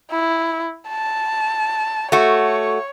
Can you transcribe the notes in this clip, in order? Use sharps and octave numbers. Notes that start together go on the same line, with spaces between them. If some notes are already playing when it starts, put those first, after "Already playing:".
E4
A5
A3 F#4 C#5